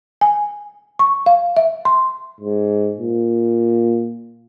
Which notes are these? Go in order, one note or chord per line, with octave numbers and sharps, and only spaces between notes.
G#5
C#6
F5
E5
C6
G#2
A#2